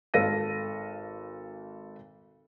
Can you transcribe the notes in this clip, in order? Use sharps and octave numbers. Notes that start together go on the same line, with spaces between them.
G#1 A4 F5 A#6 D#7